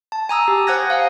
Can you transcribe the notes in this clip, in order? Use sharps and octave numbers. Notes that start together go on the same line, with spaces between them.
A5
G#5 A#5 D#6 E6
G4
C5 F#5 D#6 F#6 G#6 A#6
F5 F#5 G#5